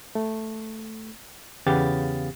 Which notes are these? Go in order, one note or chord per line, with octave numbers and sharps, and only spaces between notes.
A3
E2 C#3 B3 G4 F5 A6